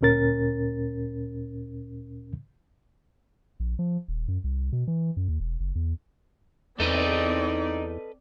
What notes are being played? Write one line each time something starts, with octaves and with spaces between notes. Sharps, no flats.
D2 A#2 C#4 A#4 A6
A#1
F3
D#1
F#2
C2
B2
E3
F#2
D#2
E1
F#1
E2
E2 C4 D#4 A4 B4 D5 D#5